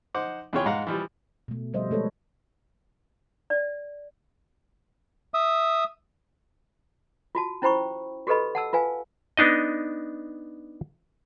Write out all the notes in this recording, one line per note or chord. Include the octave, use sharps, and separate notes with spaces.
D#4 C5 F#5 D6
E2 C3 F4 G#4 C#5 G5
G#2 F5 F#5 A#5
E3 F3 G3
B2 A3
D3 F3 G3 C5 D#5 E5
G#3 A3 A4 B4 C#5
D5
E5 D#6
F4 F#4 A5
C#4 E4 C5 G5 B5 C#6
F#4 G4 A4 B4 D#5 B5
F#5 A5 E6
F4 B4 F5 G#5
B3 D4 D#4 D#5